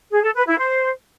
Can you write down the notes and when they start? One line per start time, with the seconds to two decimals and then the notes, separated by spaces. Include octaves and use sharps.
0.12 G#4
0.24 A4
0.35 B4
0.47 E4
0.59 C5